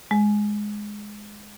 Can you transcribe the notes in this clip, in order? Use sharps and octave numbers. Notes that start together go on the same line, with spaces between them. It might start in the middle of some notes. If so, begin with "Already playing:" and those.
G#3